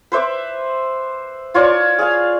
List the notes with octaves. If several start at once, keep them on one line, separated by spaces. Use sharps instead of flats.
B4 C5 E5 D6
F4 C#5 D5 A5
G#4 F5